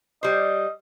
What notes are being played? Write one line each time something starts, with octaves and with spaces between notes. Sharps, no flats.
G3 C5 D#5